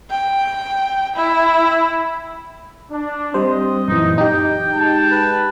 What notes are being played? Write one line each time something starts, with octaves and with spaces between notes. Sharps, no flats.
G5
E4
D4
G3 C4 C5 D#5
F#2 A#2 E3 D#4
D#4 G4 G5
G#3 A5
B4